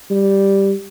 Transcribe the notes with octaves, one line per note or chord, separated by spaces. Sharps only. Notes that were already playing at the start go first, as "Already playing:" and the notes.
G3